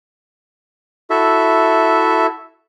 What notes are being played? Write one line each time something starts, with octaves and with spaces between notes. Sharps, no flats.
E4 F#4 A4 E5